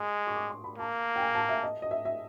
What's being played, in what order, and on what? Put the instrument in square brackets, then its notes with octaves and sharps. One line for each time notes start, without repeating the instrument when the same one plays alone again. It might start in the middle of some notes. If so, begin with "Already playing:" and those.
Already playing: [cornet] G#3 [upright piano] D#6
[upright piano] C#6
D6
C6
B5
[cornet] A#3 [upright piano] A5
[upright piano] G5
G#5
A5
E5
D#5
D#5
E5
E5